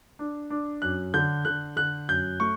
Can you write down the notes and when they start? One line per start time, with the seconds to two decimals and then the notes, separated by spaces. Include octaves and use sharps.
0.19 D4
0.50 D4
0.82 F#2 F#6
1.14 D3 G6
1.45 D3 F#6
1.77 D3 F#6
2.08 F#2 G6
2.40 A3 C#6